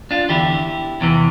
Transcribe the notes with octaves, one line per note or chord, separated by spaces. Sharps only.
D4 F4
E2 D3 E4 G4
E2 C3 E3